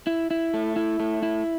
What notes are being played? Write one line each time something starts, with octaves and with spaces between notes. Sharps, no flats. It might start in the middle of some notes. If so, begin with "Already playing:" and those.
E4
E4
A3
E4
A3
E4